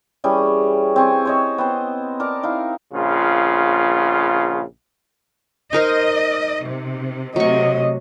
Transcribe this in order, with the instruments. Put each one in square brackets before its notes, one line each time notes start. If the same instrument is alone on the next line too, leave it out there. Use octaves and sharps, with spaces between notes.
[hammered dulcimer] E3 G3 C#4 G#4
C4 G#5 C#6
C5 C#5 D#5
B3 C4 C5
A#4 D5 A5
D#4 E4 F5 A#5
[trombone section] A#1 C#3 F4
[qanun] D#4 A#4 C5 [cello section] D#5
[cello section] C3
[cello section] C3 A3 [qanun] F#3 C#6 [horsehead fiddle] D#5